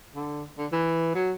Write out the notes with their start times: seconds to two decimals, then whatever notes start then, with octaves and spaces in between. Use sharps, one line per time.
0.15 D3
0.58 D3
0.72 E3
1.15 F#3